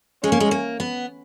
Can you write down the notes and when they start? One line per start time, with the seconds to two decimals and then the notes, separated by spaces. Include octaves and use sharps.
0.24 G#3 C#4
0.32 A#3
0.40 G#3
0.51 A#3
0.80 B3